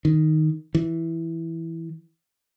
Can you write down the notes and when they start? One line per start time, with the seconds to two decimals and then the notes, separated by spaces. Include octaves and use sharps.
0.05 D#3
0.75 E3